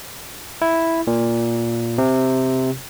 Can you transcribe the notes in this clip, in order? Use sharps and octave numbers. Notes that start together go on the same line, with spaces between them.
E4
A#2
C3